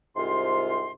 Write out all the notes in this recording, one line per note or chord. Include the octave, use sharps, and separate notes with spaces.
C2 G#2 C3 F4 C6